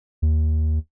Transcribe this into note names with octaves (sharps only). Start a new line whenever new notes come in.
D#2